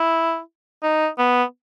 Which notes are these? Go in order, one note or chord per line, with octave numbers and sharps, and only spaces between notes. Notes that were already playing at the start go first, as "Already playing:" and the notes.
Already playing: E4
D#4
B3